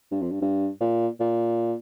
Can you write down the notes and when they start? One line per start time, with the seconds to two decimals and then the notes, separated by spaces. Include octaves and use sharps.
0.11 G2
0.22 F2
0.31 G2
0.41 G2
0.80 A#2
1.20 A#2